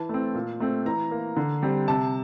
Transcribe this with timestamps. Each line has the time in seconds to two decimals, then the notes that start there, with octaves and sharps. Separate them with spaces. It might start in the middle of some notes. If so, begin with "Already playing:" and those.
Already playing: E3 A5
0.09 A3 C4
0.35 A#2
0.60 A3 C4
0.85 E3 A#5
1.11 A#3
1.36 D3
1.63 G3 C4
1.88 C3 A5